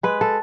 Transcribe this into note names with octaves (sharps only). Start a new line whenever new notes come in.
G#3 B4
A4